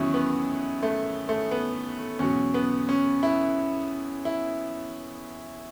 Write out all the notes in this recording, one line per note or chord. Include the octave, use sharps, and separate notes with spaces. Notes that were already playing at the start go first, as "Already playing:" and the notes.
Already playing: E2 D#3 F#3 C#4 E4
B3
A3
A3
B3
E2 B2 F#3 C#4
B3
C#4
E4
E4